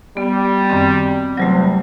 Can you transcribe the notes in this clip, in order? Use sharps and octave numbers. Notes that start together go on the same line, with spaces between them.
G3 B3
F#2 D#3 C4
E2 C3 F#3 G3 A3